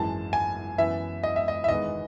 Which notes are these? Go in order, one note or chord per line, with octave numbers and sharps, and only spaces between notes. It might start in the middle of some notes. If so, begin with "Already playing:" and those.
Already playing: G#1 F#2 E3 G#3 A5
G#5
F#2 E3 B3 E5
D#5
E5
D#5
E5
E1 E2 D#3 G#3 B3 D#5